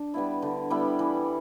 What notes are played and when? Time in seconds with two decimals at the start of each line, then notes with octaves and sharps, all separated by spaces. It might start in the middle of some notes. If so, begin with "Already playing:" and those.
Already playing: D4
0.14 G3 B3 E4
0.42 D3
0.70 G3 B3 E4
0.99 E3